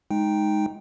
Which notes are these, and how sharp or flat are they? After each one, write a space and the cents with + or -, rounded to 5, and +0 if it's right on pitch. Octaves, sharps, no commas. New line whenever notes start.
G#3 +10 D#4 +0 G5 +5